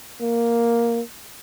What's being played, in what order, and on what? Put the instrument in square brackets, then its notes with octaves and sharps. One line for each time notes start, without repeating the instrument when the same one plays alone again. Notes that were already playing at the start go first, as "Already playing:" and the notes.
[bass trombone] A#3